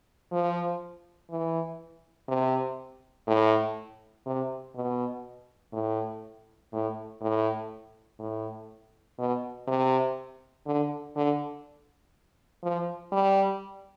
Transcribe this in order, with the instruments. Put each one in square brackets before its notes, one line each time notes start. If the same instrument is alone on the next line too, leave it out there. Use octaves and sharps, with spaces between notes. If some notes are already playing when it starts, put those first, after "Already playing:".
[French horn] F3
E3
C3
A2
C3
B2
A2
A2
A2
A2
B2
C3
D3
D3
F3
G3